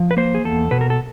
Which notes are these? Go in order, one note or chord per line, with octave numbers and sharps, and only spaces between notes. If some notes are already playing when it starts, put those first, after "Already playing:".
Already playing: F3
B4
A#3 C5
G#4
E2 A4
B2 B4
A#4
A4